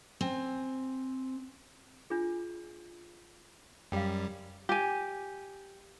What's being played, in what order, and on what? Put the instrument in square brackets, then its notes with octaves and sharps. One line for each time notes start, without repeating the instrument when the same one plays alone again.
[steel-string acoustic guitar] C4 G#5
[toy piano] D4 F4 G#4
[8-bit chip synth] F#2 G3 [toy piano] F5 G5
[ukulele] G4 G#5